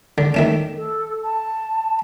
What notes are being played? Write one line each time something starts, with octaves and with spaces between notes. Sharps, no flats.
D3
D#3 A3 C#4
A4
A5